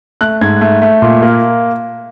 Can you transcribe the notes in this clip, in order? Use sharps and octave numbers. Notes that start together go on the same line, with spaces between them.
A3 F#6
G#2 G#6
A3
A3
A#2
A#3